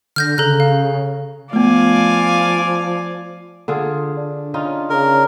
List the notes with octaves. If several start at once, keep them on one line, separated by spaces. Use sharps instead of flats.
D3 F6 G6 A#6
C#3 A4 A#5 F#6
F5
F3 A3 B3 D5 F5 G#5
D3 F4 G#4
D4
C#4 D#4 F4
C#3 A#4